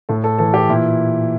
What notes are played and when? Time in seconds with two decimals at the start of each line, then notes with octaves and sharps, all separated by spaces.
0.09 A2 A4
0.24 A4
0.38 E3 A4
0.54 G4
0.69 A#2 E4